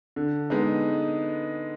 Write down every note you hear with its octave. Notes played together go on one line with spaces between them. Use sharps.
D3
G#3 B3 D#4